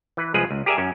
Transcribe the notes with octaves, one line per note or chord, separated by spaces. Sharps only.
E3 B4
C2 F3 G#3 G#4 B4
C#2
G4 G#4 A#4 D5 E5 G#5
F#2 C#4